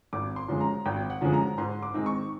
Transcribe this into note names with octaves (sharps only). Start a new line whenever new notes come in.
G#1 D6
C6
F#2 D3 F3 G#3
A#5
G#1 G5
F#5
F#2 D3 F3 G#3
A#5
G#2 C6
D6
D#3 G#3 C4 D#4
C#6